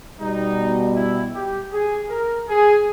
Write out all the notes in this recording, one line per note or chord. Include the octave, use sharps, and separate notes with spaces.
B2 G3 D#4
E4
G4
G#4
A#4
G#4